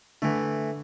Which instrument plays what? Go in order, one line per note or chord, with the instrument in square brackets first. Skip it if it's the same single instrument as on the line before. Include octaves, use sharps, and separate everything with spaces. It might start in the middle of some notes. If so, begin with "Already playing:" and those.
[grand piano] D3 [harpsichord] E3 A3